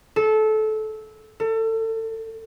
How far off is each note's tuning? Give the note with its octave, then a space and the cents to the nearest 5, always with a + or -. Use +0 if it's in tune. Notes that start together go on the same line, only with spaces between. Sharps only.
A4 -20
A4 +30